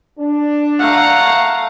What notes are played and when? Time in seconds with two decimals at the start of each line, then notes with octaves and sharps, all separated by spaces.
0.19 D4
0.79 A3 F5 F#5 A#5